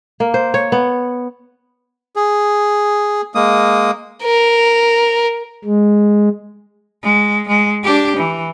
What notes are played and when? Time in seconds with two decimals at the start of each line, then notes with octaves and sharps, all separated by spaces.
0.20 A#3
0.34 C5
0.54 C#5
0.72 B3
2.16 G#4
3.35 G#3 A#3 D#6
4.24 A#4
5.65 G#3
7.03 G#3
7.48 G#3
7.84 D4 G4
8.17 E3